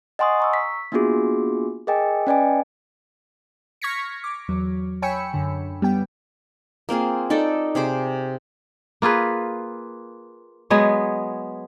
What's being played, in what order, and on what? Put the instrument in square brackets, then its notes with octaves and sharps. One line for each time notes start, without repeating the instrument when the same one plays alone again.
[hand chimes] D#5 F#5 G#5 C6 C#6 D#6
A#5 C#6 E6
B6
A#3 B3 D4 F4 F#4 G#4
G#4 A#4 D#5 G5 G#5
C#4 B4 D5 D#5 G5 G#5
[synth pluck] C#6 F6 G#6 A#6 B6 C#7
D6
E2 F#3
C#5 G5 G#5 B5 E6 C#7
F#2 D3
G3 B3 G5
[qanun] A#3 C4 F4 G#4
D#4 A4 D5
C3 G#4 C5 D6
[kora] A#3 F4 G#4 B4
F#3 G#3 B3 G#4